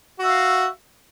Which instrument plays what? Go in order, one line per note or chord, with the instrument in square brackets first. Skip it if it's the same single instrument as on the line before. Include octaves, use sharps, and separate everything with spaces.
[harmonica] F#4
E5
F5